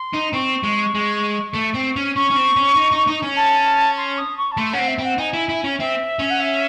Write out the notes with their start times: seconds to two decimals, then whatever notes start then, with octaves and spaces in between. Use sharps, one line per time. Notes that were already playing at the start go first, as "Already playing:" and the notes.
Already playing: C6
0.14 D#4
0.34 C4 C#6
0.64 G#3
0.95 G#3
1.55 A3
1.75 C4
1.96 C#4
2.16 C#4 C#6
2.30 C#4
2.36 C4
2.57 C#4
2.76 D#4
2.92 D#4
3.07 D#4
3.22 C#4
3.36 A5
3.97 C6
4.18 D#6
4.38 C#6
4.52 A5
4.58 A3 C6
4.73 C#4 F#5
4.79 C4
4.88 E5
4.99 C4
5.04 F#5
5.18 D#4 G#5
5.33 E4
5.49 E4
5.64 C#4
5.79 C4 E5
6.19 C#4
6.30 F#5
6.40 E5